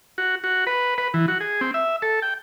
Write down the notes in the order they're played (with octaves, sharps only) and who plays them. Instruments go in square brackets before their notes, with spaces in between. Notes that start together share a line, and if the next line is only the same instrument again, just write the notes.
[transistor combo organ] F#4
F#4
B4
B4
E3
F#4
G#4
C4
E5
A4
G5